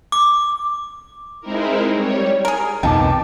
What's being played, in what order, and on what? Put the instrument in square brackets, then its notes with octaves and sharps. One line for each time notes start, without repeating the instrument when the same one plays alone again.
[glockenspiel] D6
[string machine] G#3 C4 D#4 E4 A#4
G3 C#5
[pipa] G#4 A#4
[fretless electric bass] C2 F2 B2 [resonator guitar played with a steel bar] D#3 D#4 [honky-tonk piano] G5 A5 D6